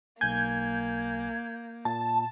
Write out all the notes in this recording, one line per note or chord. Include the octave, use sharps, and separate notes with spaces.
B1 A#3 G#5 G6 G#6
A#2 A5